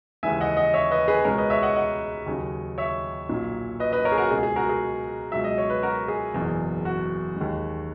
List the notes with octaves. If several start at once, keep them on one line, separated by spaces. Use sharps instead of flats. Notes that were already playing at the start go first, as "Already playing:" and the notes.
D#2 C#3 E3 G#3 E5 G#5
D#5 F#5
D#5 F#5
C#5 E5
B4 D#5
G#4 B4
C#2 B2 G#3 A#4 C#5
B4 D#5
C#5 E5
D#5 F#5
D#5 F#5
D#2 C#3 F#3
C#5 E5
B1 A#2 F#3
B4 D#5
B4 D#5
A#4 C#5
G#4
F#4 A#4
C#2 B2 G#3 G#4
G#4
F#4 A#4
G#4
C#2 B2 F#3 E5
D#5
C#5
B4
F#4 A#4
G#4
F#1 E2 B2
F#4
D#2 D#3 G#3